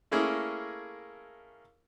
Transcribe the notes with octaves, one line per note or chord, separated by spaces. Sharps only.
A3 A#3 C#4 E4 G#4 A#4